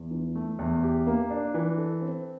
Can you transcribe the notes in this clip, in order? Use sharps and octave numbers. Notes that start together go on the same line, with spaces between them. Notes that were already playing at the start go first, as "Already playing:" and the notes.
Already playing: E2
E3
A3
E2
G4
A#3
D4
E3
A4
C4